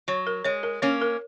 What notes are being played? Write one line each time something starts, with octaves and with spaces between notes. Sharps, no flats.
F#3 C#5
A#4
G#3 C#5
A#4
A#3 C#4 C#5
A#4